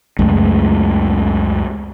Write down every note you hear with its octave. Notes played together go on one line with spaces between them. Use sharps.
C#2 F#2 G#3 A3